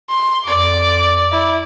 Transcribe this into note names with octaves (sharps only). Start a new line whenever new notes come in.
C6
F2 D5 D6
E4